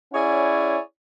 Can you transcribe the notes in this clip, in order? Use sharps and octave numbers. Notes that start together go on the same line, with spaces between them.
C#4 E4 G#4 C#5 D5 F#5